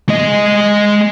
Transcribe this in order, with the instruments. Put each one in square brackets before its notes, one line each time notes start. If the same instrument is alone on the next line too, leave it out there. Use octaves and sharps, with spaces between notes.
[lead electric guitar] G#3 D#5